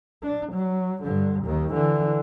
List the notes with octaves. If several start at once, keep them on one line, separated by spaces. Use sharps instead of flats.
D4
F#3
G2 D3
D#2 D#3
D3 E3